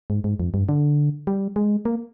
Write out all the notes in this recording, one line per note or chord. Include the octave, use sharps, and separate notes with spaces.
G#2
G#2
F2
G2
D3
G3
G#3
A#3